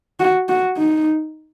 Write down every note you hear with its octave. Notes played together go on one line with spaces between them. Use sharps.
F#4
F#4
D#4